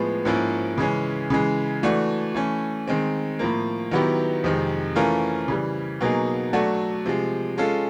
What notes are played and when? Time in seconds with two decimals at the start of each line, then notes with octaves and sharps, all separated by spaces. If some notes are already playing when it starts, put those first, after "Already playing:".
Already playing: A2 F3 G#3 B3
0.25 G#2 F3 A#3 C#4 E4
0.78 C#3 E3 G#3 C#4
1.30 C#3 E3 G#3
1.83 E3 A3 D4 F#4
2.34 E3 A3 C#4
2.87 D#3 G#3 C4
3.39 A2 F3 A#3
3.91 D#3 F#3 B3 E4 G4
4.44 F2 C3 D#3 G#3
4.96 E3 A3 C#4 F4 A#4
5.48 C#3 E3 G3
6.01 B2 F#3 A#3 D#4 G#4
6.53 F#3 A3 D4 F#4 A4
7.06 C3 F3 G#3
7.58 G#3 C#4 F4 A4